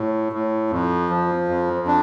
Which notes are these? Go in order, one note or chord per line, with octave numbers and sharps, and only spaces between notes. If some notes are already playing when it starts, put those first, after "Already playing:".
Already playing: A2
A2
F2
F3
F2
D4